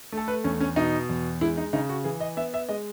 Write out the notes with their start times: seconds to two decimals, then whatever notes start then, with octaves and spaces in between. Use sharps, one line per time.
0.12 A3 A4
0.28 B4
0.44 E2 C#4
0.60 C#4
0.76 B2 D#4
1.09 E2
1.41 G#3 E4
1.57 D#4
1.73 C#3 D#4
1.89 F#4
2.04 E3 G#4
2.20 D#5
2.37 B3 E5
2.54 E5
2.69 G#3 D#5